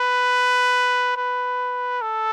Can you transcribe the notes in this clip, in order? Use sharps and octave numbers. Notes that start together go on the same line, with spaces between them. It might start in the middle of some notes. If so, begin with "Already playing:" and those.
Already playing: B4
B4
A4